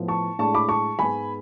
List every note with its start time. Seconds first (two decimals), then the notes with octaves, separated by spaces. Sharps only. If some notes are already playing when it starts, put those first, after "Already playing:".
Already playing: A2 F3 B3
0.08 A5 C#6
0.39 A2 G#3 D4 A5 C#6
0.54 B5 D6
0.69 A5 C#6
0.99 G#2 G#3 B3 G#5 B5